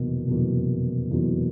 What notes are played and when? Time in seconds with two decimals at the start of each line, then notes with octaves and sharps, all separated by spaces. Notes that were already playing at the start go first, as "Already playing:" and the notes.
Already playing: F1 E2 B2 F#3 A#3
0.27 F1 E2 B2 F#3 A#3
1.11 F1 E2 B2 F#3 A#3